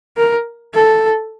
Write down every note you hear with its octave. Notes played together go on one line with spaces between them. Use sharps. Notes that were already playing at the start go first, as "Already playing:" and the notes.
A#4
A4